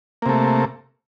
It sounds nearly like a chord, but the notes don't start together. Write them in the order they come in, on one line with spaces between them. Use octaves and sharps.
A#3 C3 A3